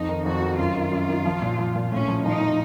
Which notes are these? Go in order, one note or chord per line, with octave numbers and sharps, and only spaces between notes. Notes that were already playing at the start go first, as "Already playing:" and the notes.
Already playing: F2 D#4
D#3
F2 F#4
D#3
F#2 F4
D#3
F#2
D#3
F3
A#2
F3
A#2
A2 C#4
F3
F3 D#4
F3